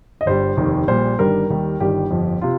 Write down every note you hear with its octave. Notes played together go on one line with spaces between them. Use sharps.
D#5
G1 G2 G3 C5
F1 D#2 D#3
A#1 A#2 G3 C5
G1 G2 D#3 G3 A#4
D#2 D#3 G3
G1 G2 D#3 G3 G4
G1 F2 F3
C3 F4